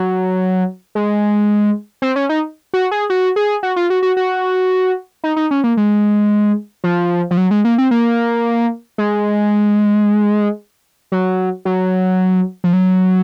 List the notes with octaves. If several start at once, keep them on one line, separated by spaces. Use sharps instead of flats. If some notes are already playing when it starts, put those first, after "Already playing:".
Already playing: F#3
G#3
C4
C#4
D#4
F#4
G#4
F#4
G#4
F#4
F4
F#4
F#4
F#4
D#4
D#4
C#4
A#3
G#3
F3
F3
F#3
G#3
A#3
C4
A#3
G#3
F#3
F#3
F3
F#3